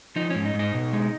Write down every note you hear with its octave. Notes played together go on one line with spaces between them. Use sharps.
F3 D#4
G#2 C#4
D#4
G#2
D#4
B2
G#3